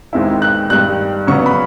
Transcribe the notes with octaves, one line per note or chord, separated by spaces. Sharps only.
D#2 D#3 G#3 C4 E4
F#6
G2 D#3 G3 F#6
C#3 F#3 B3 C#6
B5